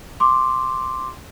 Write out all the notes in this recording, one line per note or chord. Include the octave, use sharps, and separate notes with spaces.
C6 D6